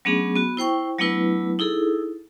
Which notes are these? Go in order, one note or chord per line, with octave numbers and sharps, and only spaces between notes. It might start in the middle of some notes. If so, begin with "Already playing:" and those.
F#3 A3 B3 C#4 D4 G#4
B3 F#4
E4 C5 G5 C#6
F#3 A3 B3 D4 E4 B4
D#4 E4 G#4 A4